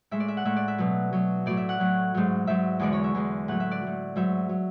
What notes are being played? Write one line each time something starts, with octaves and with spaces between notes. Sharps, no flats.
A2 G#3 E5
D5
E5
F#5
A2 G#3 E5
D5
E5
B2 F#3
B2 F#3
A2 F#3 D5
E5
F#5
A2 F#3
G#2 F#3
G#2 F#3 E5
E2 D3 G#3 D5
C#5
E5
E2 D3 G#3
A2 F#3 F#5
E5
D5
A2 F#3
G#2 F#3 E5
F#3